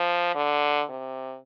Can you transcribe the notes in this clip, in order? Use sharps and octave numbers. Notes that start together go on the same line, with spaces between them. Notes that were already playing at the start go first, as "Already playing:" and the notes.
Already playing: F3
D3
C3